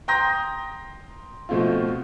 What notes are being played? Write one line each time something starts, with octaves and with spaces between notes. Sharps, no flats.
G5 A#5 C6 D#6 G6 A#6
B2 F3 A3 C4 F4